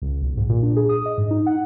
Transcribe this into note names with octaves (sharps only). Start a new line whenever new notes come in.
C#2
B1
G#2
A#2
D4
G#4
D#6
D#5
G#2
D#4
F#5